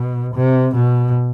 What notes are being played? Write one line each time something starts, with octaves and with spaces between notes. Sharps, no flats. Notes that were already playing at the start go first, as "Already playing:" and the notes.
Already playing: B2
C3
B2